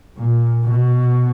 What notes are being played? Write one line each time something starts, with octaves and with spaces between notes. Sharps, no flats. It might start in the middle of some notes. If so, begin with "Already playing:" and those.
A#2
B2